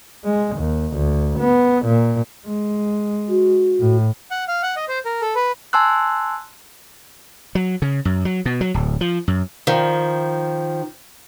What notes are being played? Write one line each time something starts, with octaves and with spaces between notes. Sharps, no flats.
G#3
D#2
D2
B3
A#2
G#3
F#4
A2
F#5
F5
F#5
D#5
C5
A#4
A4
B4
G#5 A5 C6 E6 F#6
F#3
C#3
F#2
F#3
B2
F#3
D1
F3
F#2
D#3 F3